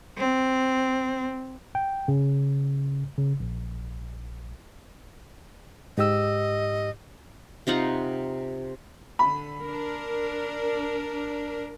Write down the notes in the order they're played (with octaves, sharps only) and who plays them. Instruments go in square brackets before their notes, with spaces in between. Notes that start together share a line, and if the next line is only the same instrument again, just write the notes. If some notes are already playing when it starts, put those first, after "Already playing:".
[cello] C4
[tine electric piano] G5
C#3
C#3
A#1
[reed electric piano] G#2 G4 E6 [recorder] D#5
[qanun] C3 D#4 F4 F#5
[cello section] D3 [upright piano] B5
[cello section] D4 A#4